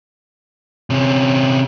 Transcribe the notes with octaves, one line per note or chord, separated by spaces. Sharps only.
C3 C#4